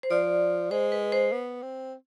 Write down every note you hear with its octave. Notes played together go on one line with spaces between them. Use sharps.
C5
F3 D5
G#3 C5
B4
C5
B3
C4